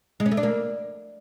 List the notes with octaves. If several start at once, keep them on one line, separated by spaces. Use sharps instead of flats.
G#3
C#4
A3
D4
A#3